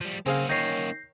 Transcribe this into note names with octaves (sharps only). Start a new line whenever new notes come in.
F3 G3
C#3 A#3 C4 C#4 G#4 F5
D#3 C#5 G6 A#6 C7